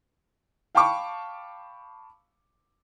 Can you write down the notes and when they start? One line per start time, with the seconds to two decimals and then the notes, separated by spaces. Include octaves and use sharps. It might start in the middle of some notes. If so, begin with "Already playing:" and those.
0.75 F5 G5 A5 B5 C#6 D6